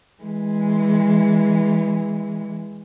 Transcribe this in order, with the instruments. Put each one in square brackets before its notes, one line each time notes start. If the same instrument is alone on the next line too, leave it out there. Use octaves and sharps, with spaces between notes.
[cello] E3 G#3